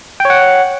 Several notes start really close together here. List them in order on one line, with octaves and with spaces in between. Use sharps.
G5 C#5 F#5